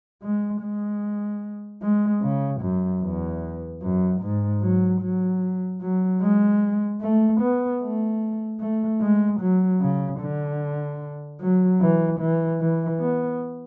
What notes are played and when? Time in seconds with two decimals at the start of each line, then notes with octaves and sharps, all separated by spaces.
0.22 G#3
0.62 G#3
1.82 G#3
2.22 C#3
2.61 F#2
3.02 E2
3.82 F#2
4.22 G#2
4.62 F#3
5.01 F#3
5.81 F#3
6.21 G#3
7.01 A3
7.41 B3
7.81 A3
8.60 A3
9.01 G#3
9.41 F#3
9.81 C#3
10.20 D3
11.41 F#3
11.81 E3
12.20 E3
12.61 E3
13.01 B3